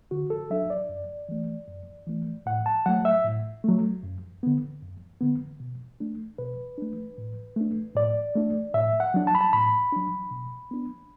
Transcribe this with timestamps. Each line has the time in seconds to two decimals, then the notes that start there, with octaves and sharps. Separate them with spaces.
0.11 D3 F#4
0.30 A4
0.50 F#3 D4 E5
0.70 D5
0.89 F#2
1.29 E3 A3
1.68 F#2
2.07 E3 A3
2.46 A2 F#5
2.66 A5
2.86 F#3 A3 F#5
3.05 E5
3.25 A2
3.64 F#3 A3
4.03 F#2
4.43 D3 B3
4.82 F#2
5.21 D3 B3
5.60 B2
6.00 A3 D4
6.38 B2 B4
6.78 A3 D4
7.18 A2
7.56 A3 D4
7.96 A2 D5
8.35 A3 D4
8.74 A2 E5
9.00 F#5
9.14 F#3 D4
9.27 A5
9.35 B5
9.41 A5
9.53 A2 B5
9.92 F#3 D4
10.31 B2
10.71 B3 D4